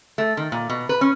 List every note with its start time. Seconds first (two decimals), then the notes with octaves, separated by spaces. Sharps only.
0.18 A3
0.37 D#3
0.52 A#2
0.70 B2
0.89 B4
1.01 C#4